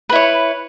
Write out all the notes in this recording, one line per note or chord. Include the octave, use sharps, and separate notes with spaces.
E4 B4 C#5